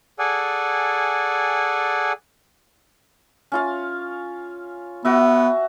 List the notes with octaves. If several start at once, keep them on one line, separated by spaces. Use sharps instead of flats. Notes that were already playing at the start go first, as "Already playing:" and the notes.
G#4 A4 D5 F#5 G#5
C#4 F4 F5
B3 F#4 E5